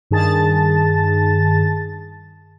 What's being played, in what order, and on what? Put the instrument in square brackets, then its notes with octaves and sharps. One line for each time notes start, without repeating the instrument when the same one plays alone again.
[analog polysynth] G2 D#3 G#4 A5 A6